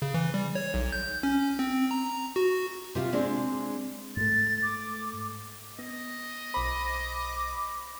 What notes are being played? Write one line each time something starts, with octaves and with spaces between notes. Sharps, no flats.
C#3
E3
G3
C#5
B1
G6
C#4
C4
A#5
F#4
C3 F4
G#3 C4 D4
G#2 A3 A6
D6
B3 D#5
B1 C5 B5 D6